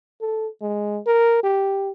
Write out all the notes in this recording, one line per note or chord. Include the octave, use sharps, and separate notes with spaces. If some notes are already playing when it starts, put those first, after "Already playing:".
A4
G#3
A#4
G4